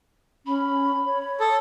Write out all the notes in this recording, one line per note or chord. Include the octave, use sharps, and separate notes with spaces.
C#4 B5
C#5
A4 D#6